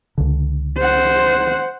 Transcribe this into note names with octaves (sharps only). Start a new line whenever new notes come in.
C#2 D3
C5 F#5